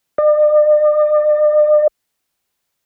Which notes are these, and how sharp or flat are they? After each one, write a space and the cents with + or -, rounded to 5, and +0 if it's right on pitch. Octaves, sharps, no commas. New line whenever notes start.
D5 +45